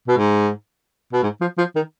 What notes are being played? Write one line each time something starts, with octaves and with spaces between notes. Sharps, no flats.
B2
G#2
B2
G#2
F3
F3
D#3